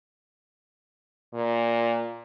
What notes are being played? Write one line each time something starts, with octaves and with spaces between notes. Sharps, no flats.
A#2